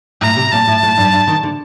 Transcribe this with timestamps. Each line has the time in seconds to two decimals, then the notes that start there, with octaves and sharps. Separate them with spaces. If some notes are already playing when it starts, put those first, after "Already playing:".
0.21 A2 A#5
0.36 C3
0.52 A#2 A5
0.67 A2
0.83 A2
0.98 G2
1.12 G2
1.27 D#3
1.43 D3